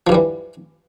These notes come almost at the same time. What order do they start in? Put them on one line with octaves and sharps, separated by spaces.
F3 G2 G3 E3